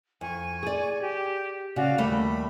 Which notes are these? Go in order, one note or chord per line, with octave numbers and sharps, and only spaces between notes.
F2 G#5 C#6
G#4 D5
G4
C#3 F#4 D5 F5
D#2 G3 A3 B5